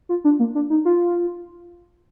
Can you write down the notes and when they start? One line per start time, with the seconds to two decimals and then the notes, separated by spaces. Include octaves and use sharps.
0.09 F4
0.24 D4
0.39 A#3
0.55 D4
0.70 D#4
0.85 F4